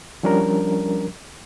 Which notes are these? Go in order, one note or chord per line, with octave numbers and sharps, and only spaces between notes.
F3 G3 C#4 D4 A#4